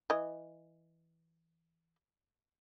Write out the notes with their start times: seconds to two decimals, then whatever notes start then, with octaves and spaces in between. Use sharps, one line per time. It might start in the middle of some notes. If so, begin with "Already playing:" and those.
0.10 E3 D#5